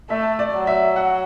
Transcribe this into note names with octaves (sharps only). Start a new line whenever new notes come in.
A3 E5
D5
F#3
E5
F#5